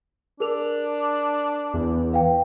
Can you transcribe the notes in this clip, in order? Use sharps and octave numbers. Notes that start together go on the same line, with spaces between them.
D4 G#4 A#4 F7
E2
B4 F5 G5